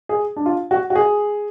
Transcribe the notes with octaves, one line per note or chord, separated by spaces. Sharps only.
G#4
D4
F4
F#4
F#4
G#4